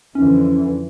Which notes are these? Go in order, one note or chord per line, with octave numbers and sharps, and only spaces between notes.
F2 D3 E3 C#4